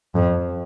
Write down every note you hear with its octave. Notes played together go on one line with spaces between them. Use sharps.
F2